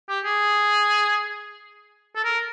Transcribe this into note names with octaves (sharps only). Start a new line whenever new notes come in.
G4
G#4
A4
A#4